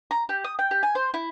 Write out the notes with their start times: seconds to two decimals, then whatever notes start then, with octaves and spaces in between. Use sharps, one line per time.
0.11 A#5
0.29 G4
0.44 D#6
0.59 G5
0.71 G4
0.83 G#5
0.95 C5
1.14 E4